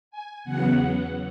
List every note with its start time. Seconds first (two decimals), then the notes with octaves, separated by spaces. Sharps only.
0.11 G#5
0.44 E2 C#3 F#3 B3 F#5